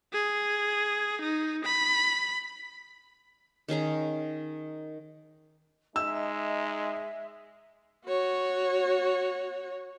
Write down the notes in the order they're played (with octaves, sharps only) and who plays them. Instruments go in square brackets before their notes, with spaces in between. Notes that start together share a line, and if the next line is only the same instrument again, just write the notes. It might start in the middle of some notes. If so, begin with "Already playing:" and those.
[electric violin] G#4
D#4
B5
[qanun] D#3 C#4 G#4 A#5
[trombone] G#3 [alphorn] D#4 [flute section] E5 [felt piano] E6
[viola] F#4 C#5